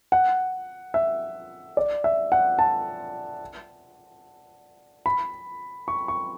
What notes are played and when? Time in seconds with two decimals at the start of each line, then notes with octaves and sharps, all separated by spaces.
0.12 F#5
0.94 E5
1.77 D5
2.04 E5
2.32 F#5
2.59 A5
5.06 B5
5.88 C#6
6.08 C#6